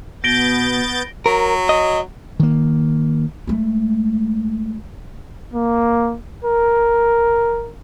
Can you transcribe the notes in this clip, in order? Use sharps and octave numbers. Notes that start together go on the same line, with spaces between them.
B2 B3 G6 A6 A#6 D7 G7
F#3 A#4
D#5
D#3 A#3
G#3 A3
A#3
A#4